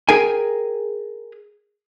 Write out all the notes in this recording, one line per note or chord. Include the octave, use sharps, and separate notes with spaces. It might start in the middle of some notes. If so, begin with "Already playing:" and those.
G#4 A#4 G5 G#5